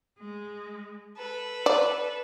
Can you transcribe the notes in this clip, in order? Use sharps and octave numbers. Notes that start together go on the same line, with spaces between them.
G#3
A4 B4
D5